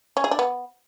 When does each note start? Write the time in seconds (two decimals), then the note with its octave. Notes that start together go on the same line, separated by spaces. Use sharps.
0.17 C#4
0.24 G#4
0.31 D4
0.39 B3